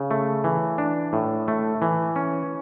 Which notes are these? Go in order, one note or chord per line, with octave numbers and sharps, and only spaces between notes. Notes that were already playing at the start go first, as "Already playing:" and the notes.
Already playing: C#3
A3
E3
D4
A2
A3
E3
C#4